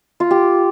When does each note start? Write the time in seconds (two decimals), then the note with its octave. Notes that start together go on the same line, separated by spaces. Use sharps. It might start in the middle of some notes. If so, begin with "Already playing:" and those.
0.20 F4
0.31 G4